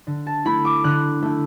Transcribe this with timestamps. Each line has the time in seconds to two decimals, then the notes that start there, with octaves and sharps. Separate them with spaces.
0.07 D3
0.27 A5
0.45 A3 E4 B5
0.65 D6
0.84 D3 F#6
1.22 A3 E4